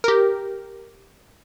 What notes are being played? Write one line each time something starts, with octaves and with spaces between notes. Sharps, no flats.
G4 A#4